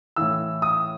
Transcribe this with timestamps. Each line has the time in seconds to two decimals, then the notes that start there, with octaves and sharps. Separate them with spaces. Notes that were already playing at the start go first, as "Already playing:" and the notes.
0.16 A2 E3 E6
0.62 D#6